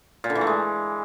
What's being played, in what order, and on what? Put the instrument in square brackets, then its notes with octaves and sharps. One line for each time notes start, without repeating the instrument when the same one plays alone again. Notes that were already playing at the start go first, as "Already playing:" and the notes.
[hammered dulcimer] A#2
D3
E3
A3
G#3